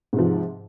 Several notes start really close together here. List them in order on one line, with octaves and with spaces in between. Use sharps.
G#2 C3 F3